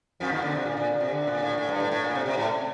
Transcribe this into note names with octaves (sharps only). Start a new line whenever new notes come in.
F2 F3
D#2 D#3
D3
C3
A#2
A#2
C3
D3
A#2
A2
A2
G2
A2
A2
A#2
C3
C3
A2